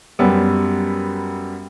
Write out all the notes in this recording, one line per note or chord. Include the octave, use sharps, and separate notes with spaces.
F#2 G3 B3